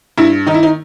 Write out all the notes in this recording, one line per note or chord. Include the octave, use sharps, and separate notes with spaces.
G2 E4
D#3 D#4
E4
D#4